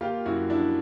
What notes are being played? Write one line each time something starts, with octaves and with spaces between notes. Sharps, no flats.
A#3 F4 G4
F#2 E4 F#4
F3 D4 E4